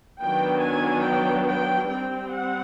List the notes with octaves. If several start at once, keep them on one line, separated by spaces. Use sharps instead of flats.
D#3 F#3 B3 D4 G5
G#5
G5
G5
G3 C4 G5
F#5